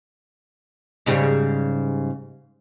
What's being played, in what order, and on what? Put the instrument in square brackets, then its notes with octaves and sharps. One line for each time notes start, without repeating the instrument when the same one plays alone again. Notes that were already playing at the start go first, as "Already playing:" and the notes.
[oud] G#2 C#3 G3